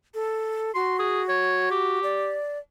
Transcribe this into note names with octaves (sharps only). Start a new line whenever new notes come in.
A4
F#4 C6
G#4
C#5
G4
D5